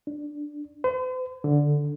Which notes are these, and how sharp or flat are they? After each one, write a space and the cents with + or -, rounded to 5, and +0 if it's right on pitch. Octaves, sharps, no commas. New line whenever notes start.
D4 +10
C5 -45
D3 -5